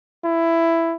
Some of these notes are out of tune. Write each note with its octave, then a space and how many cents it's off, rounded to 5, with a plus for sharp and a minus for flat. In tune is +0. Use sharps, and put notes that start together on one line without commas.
E4 +10